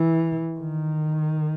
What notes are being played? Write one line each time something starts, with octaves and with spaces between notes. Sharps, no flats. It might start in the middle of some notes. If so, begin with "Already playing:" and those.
Already playing: E3
D#3